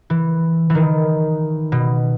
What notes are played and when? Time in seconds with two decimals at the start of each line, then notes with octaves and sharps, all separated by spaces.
0.10 E3
0.70 D#3 E3
1.72 B2